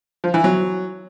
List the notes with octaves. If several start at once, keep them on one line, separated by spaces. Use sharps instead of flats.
F3
E3
F#3